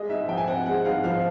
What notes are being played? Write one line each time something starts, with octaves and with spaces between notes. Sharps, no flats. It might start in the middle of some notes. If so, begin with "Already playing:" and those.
Already playing: G#3 D#5
G#2 E5
F3 G5
G#5
C4 F#5
G#3 F#5
G#2 F5
F3 F5